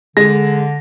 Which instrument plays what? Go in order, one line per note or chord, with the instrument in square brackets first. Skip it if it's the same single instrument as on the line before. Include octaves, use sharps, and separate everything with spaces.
[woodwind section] D3 [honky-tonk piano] G#3 [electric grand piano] A#6